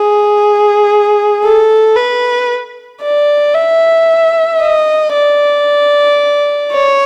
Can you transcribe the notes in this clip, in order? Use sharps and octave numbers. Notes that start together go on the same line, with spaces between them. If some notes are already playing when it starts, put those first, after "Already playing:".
Already playing: G#4
A4
B4
D5
E5
D#5
D5
C#5